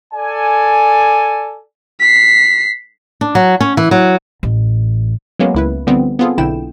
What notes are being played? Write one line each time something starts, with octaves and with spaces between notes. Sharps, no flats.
A4 D5 G#5
B6 C7
D4
F#3
C#4
E3
F#3
A1
F#3 G#3 A#3 B3 C#4
C#2 E4 B4
D3 F3 G3 B3 C4
B3 C4 F4 G#4 A4
B1 D3 E4 G5 E7